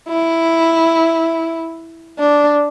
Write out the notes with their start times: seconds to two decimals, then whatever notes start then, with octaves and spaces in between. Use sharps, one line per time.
0.09 E4
2.19 D4